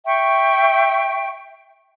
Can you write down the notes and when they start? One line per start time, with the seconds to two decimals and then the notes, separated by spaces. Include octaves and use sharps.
0.06 E5 G5 C#6